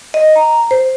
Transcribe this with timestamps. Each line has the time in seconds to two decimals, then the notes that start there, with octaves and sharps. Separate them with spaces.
0.14 D#5
0.36 A#5
0.71 C5